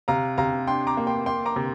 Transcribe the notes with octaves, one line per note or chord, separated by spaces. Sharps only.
C3 F5 A#5
C3 F5 A#5
D4 G5 C6
A#5 D6
A#3
G5 C6
A#3 G5 C6
A#5 D6
C3